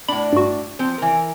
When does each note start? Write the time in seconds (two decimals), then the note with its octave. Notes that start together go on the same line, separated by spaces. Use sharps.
0.08 A2 D4 B5
0.33 G2 F#4
0.79 F3 C4
0.98 E3 A#4